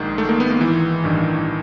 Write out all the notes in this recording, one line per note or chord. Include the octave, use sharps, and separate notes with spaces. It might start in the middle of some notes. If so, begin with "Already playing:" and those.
Already playing: A#1 G#2 D#3
A3
A#3
B3
A#3
E3
A1 G2 D#3